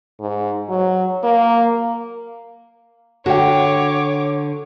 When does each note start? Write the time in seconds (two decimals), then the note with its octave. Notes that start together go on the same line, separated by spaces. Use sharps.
0.20 G#2
0.69 F#3
1.23 A#3
3.26 D3 F#4 C#5 G5 D6